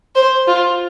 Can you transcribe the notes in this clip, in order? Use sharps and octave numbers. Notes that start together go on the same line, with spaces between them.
C5
F4